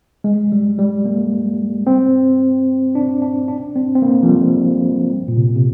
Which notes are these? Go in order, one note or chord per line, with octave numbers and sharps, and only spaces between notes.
G#3
G3
G3
A#3
C4
D4
D4
D4
C4
C4
A#3
F3
G3
A#2
C3
C3